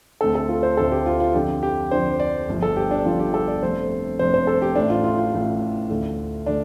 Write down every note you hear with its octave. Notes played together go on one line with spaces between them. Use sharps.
D2 D3 A3 C4 A4
A4
F4
C5
D2 D3 A3 C4 A4
G4
F4
F4
F2 D3 F3 D4 G4
G4
F2 D3 F3 D4 C5
D5
G1 G2 F3
A4
G4
D4
G1 G2 F3 F4
G4
A4
D5
F2 C3 A3 D4 C5
F2 C3 A3 D4 C5
C5
A4
G4
A1 A2 A3 D4
F4
F4
F4
A1 A2 A3
D2 D3 A3
D3 A3 D4